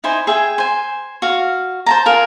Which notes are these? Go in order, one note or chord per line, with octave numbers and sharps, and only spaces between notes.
D#4 E4 C5 G#5
G#4 E5 G5 G#5
C5 G#5
F#4 F5
C5 A5 A#5
F4 G#4 A#4